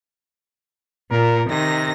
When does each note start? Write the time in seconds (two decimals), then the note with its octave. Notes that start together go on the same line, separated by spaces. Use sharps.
1.11 A#2 A#4
1.50 C3 D#3 A#6